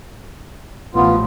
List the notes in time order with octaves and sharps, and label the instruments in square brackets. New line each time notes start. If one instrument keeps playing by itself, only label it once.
[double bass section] A1 F3 [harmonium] B3 F4